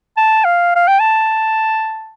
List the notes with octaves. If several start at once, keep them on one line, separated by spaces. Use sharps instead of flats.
A5
F5
F5
G5
A5